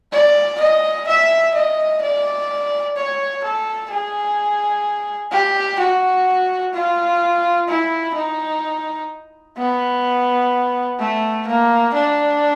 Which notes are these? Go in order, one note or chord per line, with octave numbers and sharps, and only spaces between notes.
D5
D#5
E5
D#5
D5
C#5
A4
G#4
G4
F#4
F4
E4
D#4
B3
A3
A#3
D4